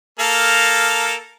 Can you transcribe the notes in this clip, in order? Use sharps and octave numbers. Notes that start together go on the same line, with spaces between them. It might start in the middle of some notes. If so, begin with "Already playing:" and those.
A#3 A4 F5